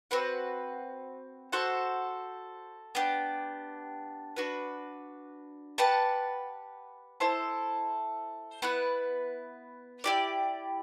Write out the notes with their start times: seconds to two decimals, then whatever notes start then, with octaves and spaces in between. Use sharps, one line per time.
0.11 C4 F#4 B4 F#5
1.52 F#4 A4 C5 F#5
2.95 B3 D4 G4
4.36 D4 F#4 B4
5.78 G4 B4 F#5 A5
7.20 E4 A4 C5
8.62 B3 E4 B4 F#5
10.04 E4 G4 D5